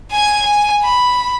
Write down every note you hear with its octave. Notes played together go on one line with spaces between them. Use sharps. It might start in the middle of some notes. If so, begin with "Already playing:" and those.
G#5 G#6
G#5
B5